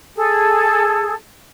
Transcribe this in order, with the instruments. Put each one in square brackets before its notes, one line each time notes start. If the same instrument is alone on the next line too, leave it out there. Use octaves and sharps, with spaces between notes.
[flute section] G#4 A4